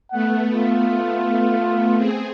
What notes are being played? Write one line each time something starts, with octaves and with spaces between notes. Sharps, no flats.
A3 B3 F#5
F4
C4 G#4